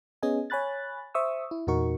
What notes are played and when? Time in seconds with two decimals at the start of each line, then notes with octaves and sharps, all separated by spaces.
0.23 B3 C#4 G#4 D#5 G#5
0.50 C#5 G#5 B5 F#6 A6
1.14 C5 E5 C#6 D#6 E6
1.51 E4
1.67 E2 A#2 D#4 F#4 A#4 C#6